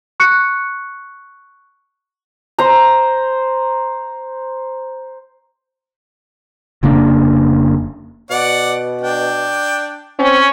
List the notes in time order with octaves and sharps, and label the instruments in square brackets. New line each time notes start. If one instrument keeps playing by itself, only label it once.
[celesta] C#6 F#6 C#7
[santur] C5 A#5
[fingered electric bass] F1 C#3 A#3 D4
[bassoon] B2 [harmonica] D5 F#5
[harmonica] D4 G5
[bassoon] C4 [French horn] C#4